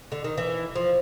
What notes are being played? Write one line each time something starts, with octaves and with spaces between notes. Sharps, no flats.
D3
D#3
E3
F3